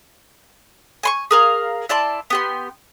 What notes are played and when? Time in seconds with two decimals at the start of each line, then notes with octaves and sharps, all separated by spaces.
1.03 G#5 C6 C#6
1.31 G#4 A#4 F5
1.89 E4 D5 A5 C6
2.30 B3 G4 C6